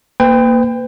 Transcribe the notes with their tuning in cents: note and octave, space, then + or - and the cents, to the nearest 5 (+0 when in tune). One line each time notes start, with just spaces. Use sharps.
A#3 +0 B4 +40 G5 +20